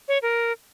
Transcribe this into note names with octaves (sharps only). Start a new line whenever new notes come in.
C#5
A#4